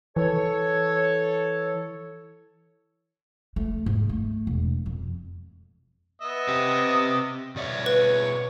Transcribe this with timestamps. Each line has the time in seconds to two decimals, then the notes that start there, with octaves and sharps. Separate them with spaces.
0.16 E3 A4 C#5
3.56 A3
3.86 G#2
4.09 A3
4.47 E1
4.86 F2
6.22 B3 D#5 E5
6.48 C4 G4
7.56 B2 C#5 D5 E5
7.86 B4